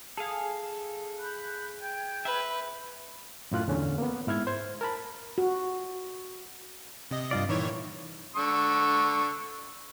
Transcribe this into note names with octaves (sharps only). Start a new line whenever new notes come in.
G#4 A4 F5
B5 F#6 G6
G5 G6 G#6
B4 E5
F#2 A2 F4 F#6
E2 D3 C#4
A#3 B3
G#2 E4 F6 G#6
C5 G#6
A#4 A5 B5
F#4
C3 D#5
G2 F4 D5
A#2 D#3 E3 C#5
D3 C#6 E6